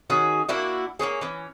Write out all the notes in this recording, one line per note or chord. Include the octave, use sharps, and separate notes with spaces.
D#3 C#4 F#4 G#4
A#3 D4 E4 F#4
A#3 C4 C#4 G#4
E3 C#4